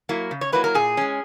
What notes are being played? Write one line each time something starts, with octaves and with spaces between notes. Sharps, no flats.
F#3 A#3 E4
C#3
C#5
F#3 A#3 E4 B4
A#4
A#2 G#4
G#3 C#4